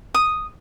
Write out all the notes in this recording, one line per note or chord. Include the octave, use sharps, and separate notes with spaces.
D#6